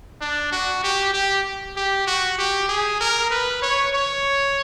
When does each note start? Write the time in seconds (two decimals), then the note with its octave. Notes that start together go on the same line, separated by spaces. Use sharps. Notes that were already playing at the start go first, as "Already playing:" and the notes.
0.21 D4
0.52 F#4
0.83 G4
1.14 G4
1.76 G4
2.07 F#4
2.38 G4
2.69 G#4
3.01 A#4
3.31 B4
3.62 C#5
3.93 C#5